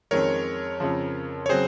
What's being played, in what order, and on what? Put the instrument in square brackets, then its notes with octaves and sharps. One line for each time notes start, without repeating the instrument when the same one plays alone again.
[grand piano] F2 D#3 G#3 C#4 [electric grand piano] A#4 C#5
[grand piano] F2 C#3 F3
[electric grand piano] C#5
[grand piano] C#3 F#3 C4 [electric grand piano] G#4 C5